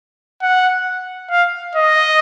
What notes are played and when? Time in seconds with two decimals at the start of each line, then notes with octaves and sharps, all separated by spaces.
0.42 F#5
1.31 F5
1.75 D#5